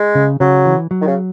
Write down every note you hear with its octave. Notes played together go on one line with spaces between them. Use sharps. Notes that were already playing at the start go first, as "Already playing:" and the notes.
Already playing: G#3
C#3
C#3 F#3
E3
F#3
D#3
C#3